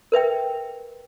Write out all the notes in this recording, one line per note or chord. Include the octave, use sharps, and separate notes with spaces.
A#4 B4 E5 G5